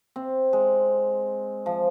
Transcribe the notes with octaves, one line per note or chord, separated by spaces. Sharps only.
C4
G#3
F3